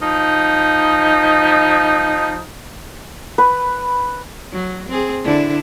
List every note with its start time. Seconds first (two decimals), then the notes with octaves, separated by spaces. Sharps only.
0.02 F3 D#4
3.38 B4
4.52 F#3
4.89 C4 G#4
5.24 D3 D4 E4